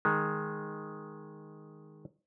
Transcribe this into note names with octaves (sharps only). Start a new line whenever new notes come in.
D#3 G#3